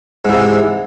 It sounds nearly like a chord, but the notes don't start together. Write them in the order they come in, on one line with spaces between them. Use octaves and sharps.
G#2 E3 C3